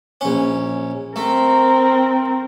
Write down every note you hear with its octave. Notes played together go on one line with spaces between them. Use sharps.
A#1 C#4
A3 C4 A#4